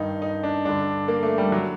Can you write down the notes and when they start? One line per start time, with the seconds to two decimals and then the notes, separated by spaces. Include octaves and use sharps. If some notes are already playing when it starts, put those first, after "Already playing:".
Already playing: G2 D#3 D#4
0.22 D#4
0.43 D4
0.65 G2 D3 D4
1.08 A#3
1.23 A3
1.38 G3
1.52 D3 F#3